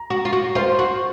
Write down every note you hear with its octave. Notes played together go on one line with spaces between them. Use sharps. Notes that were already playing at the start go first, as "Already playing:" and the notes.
Already playing: A#5
F#4
F4
F#4
F4 C5
F#4